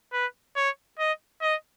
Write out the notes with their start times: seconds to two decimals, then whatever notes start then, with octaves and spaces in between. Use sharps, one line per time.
0.13 B4
0.56 C#5
0.99 D#5
1.42 D#5